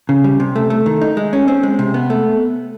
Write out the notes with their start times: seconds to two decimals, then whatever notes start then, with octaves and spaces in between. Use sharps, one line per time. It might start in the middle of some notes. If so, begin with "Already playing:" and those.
0.09 C#3
0.24 G3
0.40 C3
0.56 A3
0.70 A3
0.86 D#3
1.01 D#4
1.17 G#3
1.33 C#4
1.48 C4
1.63 G#3
1.79 C3
1.94 B3
2.10 A3